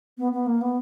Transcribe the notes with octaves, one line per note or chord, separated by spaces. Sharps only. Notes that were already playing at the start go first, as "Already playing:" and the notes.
B3
B3
A#3
B3